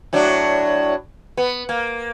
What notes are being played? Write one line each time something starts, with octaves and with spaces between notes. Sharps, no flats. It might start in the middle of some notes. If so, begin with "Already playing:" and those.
A2 F#3 D4
B3
A#3